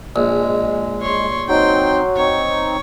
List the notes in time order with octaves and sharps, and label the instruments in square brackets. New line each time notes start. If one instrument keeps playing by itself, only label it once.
[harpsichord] A#1 [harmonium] G#3
[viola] C#5 C6
[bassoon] F#3 [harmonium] C4 D#4 [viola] G5 C6
[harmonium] C4 D#4 [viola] C#5